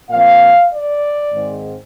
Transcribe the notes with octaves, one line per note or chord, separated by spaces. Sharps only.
A#2 F3 C4 F5
D5
G#2 D#3 G#3 C4